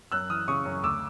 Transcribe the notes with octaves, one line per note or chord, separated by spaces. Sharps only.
F#2 E6 F#6
E3 D#6 F6
C#3 C#6 D#6
F#2
D2 D6 E6